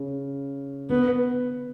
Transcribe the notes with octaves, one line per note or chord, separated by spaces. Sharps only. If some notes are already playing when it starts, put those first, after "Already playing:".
Already playing: C#3
D3 B3